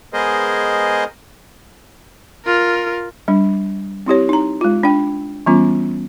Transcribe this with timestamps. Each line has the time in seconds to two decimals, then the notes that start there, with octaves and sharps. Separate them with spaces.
0.13 G#3 B3 G#4 A#4 C5 D#5
2.45 F4 A#4
3.28 G3 D4
4.06 C4 E4 G4 C#5
4.29 D#4 A#5
4.61 G#3 F4
4.83 D4 G5
5.46 E3 G3 B3 C#4 F4